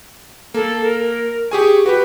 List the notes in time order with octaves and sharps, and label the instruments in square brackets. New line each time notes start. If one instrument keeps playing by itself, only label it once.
[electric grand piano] A#3 [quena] A4
[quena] A#4
[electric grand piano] G4 G#4 G#5 [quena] C#6
[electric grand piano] F#4 G4 [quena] B4